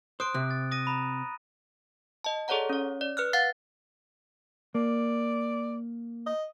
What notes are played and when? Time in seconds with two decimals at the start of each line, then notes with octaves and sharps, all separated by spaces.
0.20 C5 D#6 F#6 D7
0.34 C3 F#6
0.51 A6
0.71 D#6 A#6 D#7
0.85 A#5 B5 D#6
2.24 D#5 A5
2.48 G#4 A4 C#5 D5 F#5 A#5
2.70 C#4 C#5
3.01 D5
3.17 B4 F6 F#6
3.33 F5 F#5 A6 C7
4.75 A#3 D5
6.26 D#5